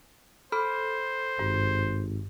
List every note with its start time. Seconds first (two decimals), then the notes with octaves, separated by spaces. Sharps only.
0.52 A4 C5 B5 F6
1.39 G#1 G2